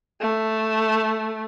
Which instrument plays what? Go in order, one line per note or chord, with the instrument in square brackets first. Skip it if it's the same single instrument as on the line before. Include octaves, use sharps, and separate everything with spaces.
[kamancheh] A3